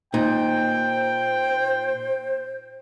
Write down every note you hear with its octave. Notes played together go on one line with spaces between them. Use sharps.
A#2 D#4 C5 G5